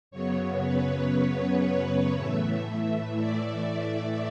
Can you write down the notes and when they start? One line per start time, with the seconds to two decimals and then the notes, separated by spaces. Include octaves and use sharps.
0.11 F#2 C#3 F#3 B3 C#5
0.62 B4
1.65 C#5
2.16 A2 E3 A3 E5
3.18 D5